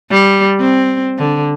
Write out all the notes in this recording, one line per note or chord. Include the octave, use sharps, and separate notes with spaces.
G3
C4
D3